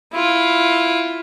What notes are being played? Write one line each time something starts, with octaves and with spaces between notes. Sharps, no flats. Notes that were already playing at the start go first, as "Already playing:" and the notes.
E4 F4